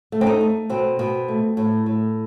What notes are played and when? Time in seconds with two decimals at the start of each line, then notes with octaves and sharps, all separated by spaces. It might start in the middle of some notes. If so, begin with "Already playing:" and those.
0.12 A3
0.21 C4
0.27 D#4
0.41 A3
0.70 B2 C4
0.99 B2
1.28 A3
1.57 A2
1.86 A2